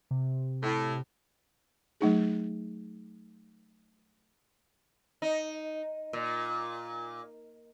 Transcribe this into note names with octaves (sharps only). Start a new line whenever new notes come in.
C3
A2
F#3 A3 D#4 G#4
D#4
A#2